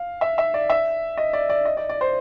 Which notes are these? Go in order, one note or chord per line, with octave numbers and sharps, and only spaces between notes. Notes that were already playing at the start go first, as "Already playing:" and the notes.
Already playing: F5
E5
E5
D5
E5
D#5
D5
D5
D#5
D5
D5
C5